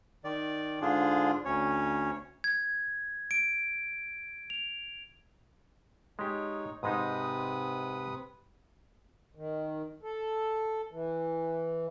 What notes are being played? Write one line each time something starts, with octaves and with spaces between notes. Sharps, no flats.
D#3 D5
G#2 D3 D4 F4 G#4
D2 C#4 C#5
G#6
D7
F7
G#3 D#4 G4 C#5
G#2 C3 G#3 D#4 B4 D#6
D#3
A4
E3